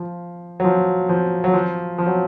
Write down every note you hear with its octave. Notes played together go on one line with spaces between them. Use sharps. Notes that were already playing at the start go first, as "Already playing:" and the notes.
Already playing: F3
F#3
F3
F3
F#3
F3
F3
F#3